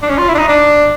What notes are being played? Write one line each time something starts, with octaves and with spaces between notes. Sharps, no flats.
D4
C#4
F4
E4
D4
D#4
D4